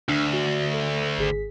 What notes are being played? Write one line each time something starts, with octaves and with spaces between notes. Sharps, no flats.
D2 D4
F#4
A4
G#1 G#4 B6